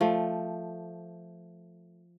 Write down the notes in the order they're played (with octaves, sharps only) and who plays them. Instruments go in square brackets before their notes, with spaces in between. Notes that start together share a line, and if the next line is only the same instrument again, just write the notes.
[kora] F3 A3